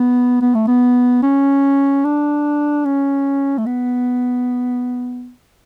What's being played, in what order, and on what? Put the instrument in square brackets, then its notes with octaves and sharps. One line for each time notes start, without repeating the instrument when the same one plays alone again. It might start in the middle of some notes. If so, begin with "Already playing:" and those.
Already playing: [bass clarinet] B3
B3
A3
B3
C#4
D4
C#4
A3
B3